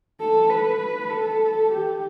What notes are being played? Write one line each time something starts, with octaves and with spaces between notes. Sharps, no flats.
A4
B4
A4
G4